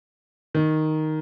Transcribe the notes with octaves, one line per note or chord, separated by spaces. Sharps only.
D#3